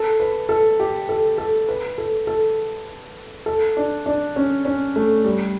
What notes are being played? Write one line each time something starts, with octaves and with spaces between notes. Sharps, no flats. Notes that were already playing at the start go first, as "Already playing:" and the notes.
Already playing: A4
B4
A4
G4
A4
A4
B4
A4
A4
A4
D4
D4
C#4
C#4
A3
G3